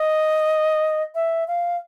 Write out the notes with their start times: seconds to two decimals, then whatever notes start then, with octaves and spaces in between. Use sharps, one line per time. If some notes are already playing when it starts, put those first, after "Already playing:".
Already playing: D#5
1.15 E5
1.48 F5